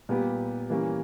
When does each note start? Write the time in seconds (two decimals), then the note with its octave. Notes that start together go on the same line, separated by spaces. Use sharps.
0.09 A#2 G3 B3 G4
0.70 E3 G3 A#3 C#4